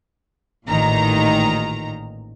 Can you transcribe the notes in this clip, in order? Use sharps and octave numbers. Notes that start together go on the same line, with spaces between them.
A1 A#2 D#3 A#5